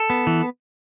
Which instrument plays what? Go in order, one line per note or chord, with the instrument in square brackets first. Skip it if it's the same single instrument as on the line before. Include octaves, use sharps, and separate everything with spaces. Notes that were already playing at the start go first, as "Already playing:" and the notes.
Already playing: [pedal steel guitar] A4
B3
E3